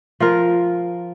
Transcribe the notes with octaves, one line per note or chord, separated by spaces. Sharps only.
F3 F4 A#4